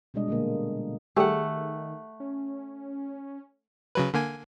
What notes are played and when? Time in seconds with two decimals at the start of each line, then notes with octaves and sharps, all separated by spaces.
0.14 B2 G3 G#3 D4 D#5
0.28 A#2 D3 A#3
1.16 D#3 G3 A3 G4 G#4 F#5
2.20 C#4
3.95 C#3 F#3 B4
4.14 D3 A#3 G#5